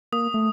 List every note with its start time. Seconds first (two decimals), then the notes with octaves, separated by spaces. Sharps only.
0.12 A#3 D#6
0.34 A3